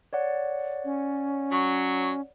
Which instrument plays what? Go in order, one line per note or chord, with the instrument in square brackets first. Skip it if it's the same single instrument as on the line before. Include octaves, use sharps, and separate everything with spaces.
[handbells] C#5 D5 F#5
[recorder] C#4
[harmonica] F#3 C#6